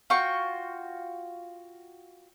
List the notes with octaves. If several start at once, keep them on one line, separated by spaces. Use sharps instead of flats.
F4 F#4 G5 C#6